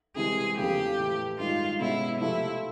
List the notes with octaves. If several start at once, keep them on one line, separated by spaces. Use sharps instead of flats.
C2 C3 E3 G#3 C4 G#4
E2 C#3 F3 A3 G4
A2 E3 A3
G2 D#3 G#3 F4
B2 G#3 C#4 E4 F#4
C3 F3 A3 C4 E4